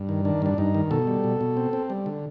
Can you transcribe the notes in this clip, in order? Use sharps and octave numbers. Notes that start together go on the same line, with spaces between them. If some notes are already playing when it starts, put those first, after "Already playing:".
Already playing: G2
D#3
D#3 D4
G2 D4
G2 D#4
D#3
B2 A4
G3
B2
B2
C4
C4
G3
D3